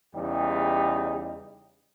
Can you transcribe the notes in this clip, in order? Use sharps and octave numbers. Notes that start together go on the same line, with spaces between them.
E2 C#3 G3 D#4 G4